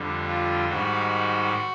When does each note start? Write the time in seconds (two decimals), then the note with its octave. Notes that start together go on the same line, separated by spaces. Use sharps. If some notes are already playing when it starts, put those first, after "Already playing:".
Already playing: F2 D3 G3
0.27 F4
0.69 G#2 D#3 G3 F#4